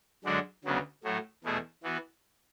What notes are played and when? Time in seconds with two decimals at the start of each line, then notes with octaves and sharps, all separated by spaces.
0.24 F#2 D3 G#3 D4 F#4
0.64 D2 C#3 F#3 B3
1.04 A2 F#3 A3
1.44 E2 B2 A3 E4 G#4
1.83 E3 B3 F#4